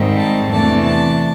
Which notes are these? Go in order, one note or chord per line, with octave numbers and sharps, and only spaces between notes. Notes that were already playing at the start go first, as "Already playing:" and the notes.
Already playing: G#2 D#3 G3 C4
A5
E2 C3 E3 A3 D4 A5
A5